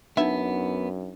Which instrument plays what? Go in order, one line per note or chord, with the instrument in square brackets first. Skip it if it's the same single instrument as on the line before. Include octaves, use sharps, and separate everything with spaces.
[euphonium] F#2 [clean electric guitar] B3 [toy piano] D4 D#4 [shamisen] E5